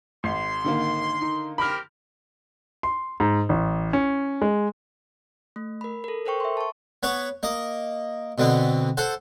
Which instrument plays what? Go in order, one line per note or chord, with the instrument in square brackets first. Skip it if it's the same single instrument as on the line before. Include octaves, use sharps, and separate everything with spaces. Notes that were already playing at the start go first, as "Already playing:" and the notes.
[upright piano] G#1 [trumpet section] C6
[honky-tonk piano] D3 D#3 A#3
[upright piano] D#4
[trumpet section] C4 G4 A#4 [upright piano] B5 F6
[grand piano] C6
G#2
A1
C#4
G#3
[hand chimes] A3
A#4 B5
A4 A#4
A4 A#4 C5 G5 C#6
E5 C6
A5 C#6
[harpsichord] B3 B4 C#5
A#3 D#5
B2 D3 B3 C4
A4 C5 F#5